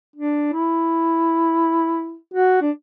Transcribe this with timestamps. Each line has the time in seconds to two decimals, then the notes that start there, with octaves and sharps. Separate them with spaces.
0.16 D4
0.53 E4
2.34 F#4
2.62 D4